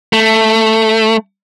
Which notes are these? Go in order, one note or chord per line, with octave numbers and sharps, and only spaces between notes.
A3